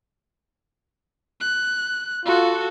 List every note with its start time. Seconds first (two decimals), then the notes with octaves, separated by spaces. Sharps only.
1.41 F#6
2.26 F4 F#4 A4